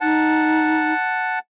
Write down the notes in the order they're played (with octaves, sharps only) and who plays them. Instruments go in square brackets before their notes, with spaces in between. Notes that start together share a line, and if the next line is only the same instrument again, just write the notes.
[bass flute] D#4 [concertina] F#5 A5